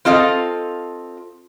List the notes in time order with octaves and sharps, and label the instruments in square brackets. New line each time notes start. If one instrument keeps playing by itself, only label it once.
[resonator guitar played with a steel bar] C4 F4 A4 D#5 F5